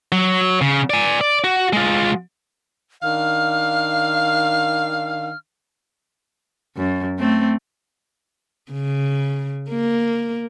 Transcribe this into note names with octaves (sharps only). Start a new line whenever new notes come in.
F#3
C#3
D5 G#5
D5
F#4
G#3 F4
D#3 D4 F5 F6
F#2
A3 C4
C#3
A#3